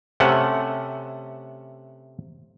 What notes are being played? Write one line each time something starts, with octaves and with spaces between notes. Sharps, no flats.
C3 A3 C#4 F#5 A5